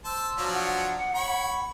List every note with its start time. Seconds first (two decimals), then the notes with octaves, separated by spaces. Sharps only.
0.04 C5 A5 E6
0.38 F3 F#3 D4
0.53 F#5
1.15 C#5 B5